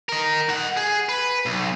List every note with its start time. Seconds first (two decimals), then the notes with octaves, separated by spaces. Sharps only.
0.09 A#4 D#5
0.49 D#4 F#5
0.77 G#4
1.09 B4
1.46 B1